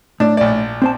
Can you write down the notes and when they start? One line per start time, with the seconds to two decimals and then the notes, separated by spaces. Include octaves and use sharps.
0.20 A2 D4
0.37 A#1 D5
0.82 C4 C5 A5